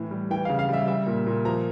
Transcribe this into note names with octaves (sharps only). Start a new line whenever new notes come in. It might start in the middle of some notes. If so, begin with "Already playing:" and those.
Already playing: A2 E3
G3
E3 G5
C#3 F5
F5
G3 E5
G3 E5
A#2
A#2
F3 A#5